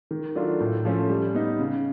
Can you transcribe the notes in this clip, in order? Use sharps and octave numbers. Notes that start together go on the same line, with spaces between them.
D#3
F#3 A3 D4 F4
A2
F3 A3 C#4
G3
B3 D#4
C#3